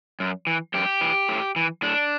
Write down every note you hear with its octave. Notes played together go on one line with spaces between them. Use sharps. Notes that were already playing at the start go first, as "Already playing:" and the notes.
F#2
E3
F#2 G4
E3
A2
E3
A2 D4